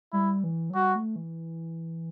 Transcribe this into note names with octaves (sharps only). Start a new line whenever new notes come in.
G3 E4
E3
F#3
G3 F#4
A3
E3